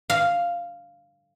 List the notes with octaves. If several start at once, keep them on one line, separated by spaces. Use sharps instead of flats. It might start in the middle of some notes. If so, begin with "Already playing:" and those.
F5